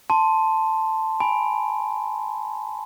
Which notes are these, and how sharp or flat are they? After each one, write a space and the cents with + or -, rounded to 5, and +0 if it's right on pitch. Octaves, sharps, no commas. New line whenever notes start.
A5 +0 C6 +0
G#5 +0 B5 +0